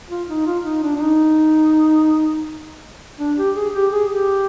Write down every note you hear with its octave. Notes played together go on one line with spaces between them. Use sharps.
F4
D#4
F4
D#4
D4
D4
D#4
D4
G4
G#4
G4
G#4
G4